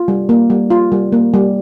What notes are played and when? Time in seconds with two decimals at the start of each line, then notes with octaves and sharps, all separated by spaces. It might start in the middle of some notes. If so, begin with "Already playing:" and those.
Already playing: F4
0.08 G3
0.29 A#3
0.50 G3
0.70 F4
0.92 G3
1.12 A#3
1.34 G3